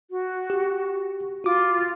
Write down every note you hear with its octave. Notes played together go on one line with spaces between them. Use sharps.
F#4
G4
F4 F#4 D6